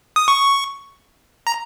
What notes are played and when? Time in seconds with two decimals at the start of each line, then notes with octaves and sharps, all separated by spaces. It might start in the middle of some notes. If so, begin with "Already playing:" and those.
0.16 D#6
0.28 C#6
1.47 A#5